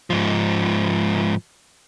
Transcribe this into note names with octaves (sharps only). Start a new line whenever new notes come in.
G#2 F3